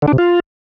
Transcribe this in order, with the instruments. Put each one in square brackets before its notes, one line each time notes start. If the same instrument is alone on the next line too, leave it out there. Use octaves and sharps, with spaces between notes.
[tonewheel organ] D3
D4
C3
F4